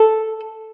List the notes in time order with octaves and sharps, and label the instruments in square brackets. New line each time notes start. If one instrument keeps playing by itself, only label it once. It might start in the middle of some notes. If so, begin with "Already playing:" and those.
Already playing: [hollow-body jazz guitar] A4